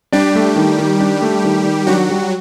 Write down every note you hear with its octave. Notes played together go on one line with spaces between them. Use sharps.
G3 D4 G4
A3
D#3
D#3
D4
A3
D#3
D#3
F#3 D4 F#4
G3